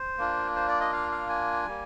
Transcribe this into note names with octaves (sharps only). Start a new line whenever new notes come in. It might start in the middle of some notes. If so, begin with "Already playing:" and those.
Already playing: C5
A#3 D4 F4
C5
D5
D#5
F5
F5
G#5
G3 A#3